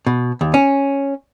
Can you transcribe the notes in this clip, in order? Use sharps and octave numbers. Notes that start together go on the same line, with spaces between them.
B2
D#2
C#4